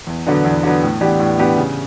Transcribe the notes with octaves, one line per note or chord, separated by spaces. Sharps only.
E2
D3 F#3 B3 D4
E2
D3 F#3 B3 D4
A2
E3 B3 D4 G4
A2
E3 B3 D4 G4
C#3